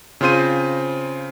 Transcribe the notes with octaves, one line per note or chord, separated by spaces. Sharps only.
C#3 C4 F4 C5 D#7